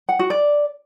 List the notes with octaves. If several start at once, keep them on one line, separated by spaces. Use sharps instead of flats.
F#5
F#4
D5